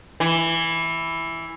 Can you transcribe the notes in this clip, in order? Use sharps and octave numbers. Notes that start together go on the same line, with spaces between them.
E3